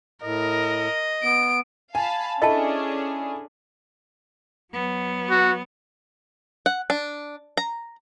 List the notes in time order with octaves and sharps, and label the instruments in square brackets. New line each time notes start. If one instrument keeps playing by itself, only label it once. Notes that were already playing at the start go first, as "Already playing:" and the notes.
[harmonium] A2 [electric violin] A#4 [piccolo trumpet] D#5
[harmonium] B3 [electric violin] D7
[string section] F5 A5 B5 [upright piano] G#5
[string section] C#4 D4 G#4 [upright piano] E4 A4 B5 [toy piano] D#5 A5
[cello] F#3 B3
[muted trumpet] F#4
[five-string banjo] F#5
D4
A#5